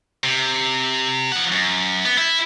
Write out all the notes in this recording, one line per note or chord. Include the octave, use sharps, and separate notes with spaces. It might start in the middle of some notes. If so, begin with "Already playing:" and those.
C3
F3 F#5
F#2
B3
E4